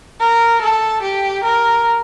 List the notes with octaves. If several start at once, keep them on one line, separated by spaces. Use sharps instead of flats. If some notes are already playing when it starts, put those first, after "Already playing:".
A#4
A4
G4
A#4